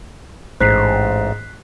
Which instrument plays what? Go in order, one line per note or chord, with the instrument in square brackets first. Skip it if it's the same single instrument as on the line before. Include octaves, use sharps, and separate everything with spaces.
[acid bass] A1 [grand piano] G#2 [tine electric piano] C5 [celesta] F#6 B6 C7